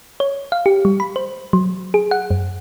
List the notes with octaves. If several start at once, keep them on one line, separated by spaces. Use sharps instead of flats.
C#5
F5
G4
G3
B5
C5
F#3
G#4
F#5
F#2